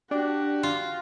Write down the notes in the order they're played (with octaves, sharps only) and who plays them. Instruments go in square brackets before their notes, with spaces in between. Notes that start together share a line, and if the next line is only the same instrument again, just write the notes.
[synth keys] D4 [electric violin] F#4 [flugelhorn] G4
[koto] F4